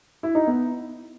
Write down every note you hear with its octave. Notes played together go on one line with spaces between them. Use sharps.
E4
D#4
B3